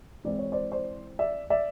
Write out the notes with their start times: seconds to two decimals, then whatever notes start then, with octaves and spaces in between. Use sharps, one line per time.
0.25 E3 G#3 C4 E4 D5
0.39 C#5
0.52 C5 D5
0.72 C5 D5
1.19 D5 E5
1.50 D5 E5